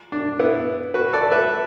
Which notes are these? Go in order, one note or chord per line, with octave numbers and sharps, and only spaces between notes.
D4
B3 E4
F#4 B4
A4 D5
B4 E5